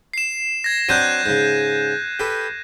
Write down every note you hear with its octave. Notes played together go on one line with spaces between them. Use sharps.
C7 E7
G#6 A#6
F#3 C4 D4 F#6 G6 D#7
G#2 C#3
G4 A4 B4